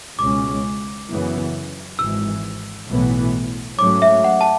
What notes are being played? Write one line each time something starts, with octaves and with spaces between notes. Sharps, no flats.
C#2 B2 G#3 C#4 D6
F#2 C#3 E3 B3
G#1 G#2 E3 E6
B1 A2 E3 B3
G#2 F#3 A3 C#4 D6
E5
F#5
A5